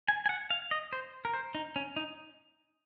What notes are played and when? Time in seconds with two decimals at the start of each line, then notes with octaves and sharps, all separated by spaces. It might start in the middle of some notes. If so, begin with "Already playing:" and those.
0.08 G#5
0.26 G#5
0.29 F#5
0.50 F5
0.71 D#5
0.93 C5
1.25 A#4
1.34 C5
1.55 D#4
1.76 C#4
1.96 D#4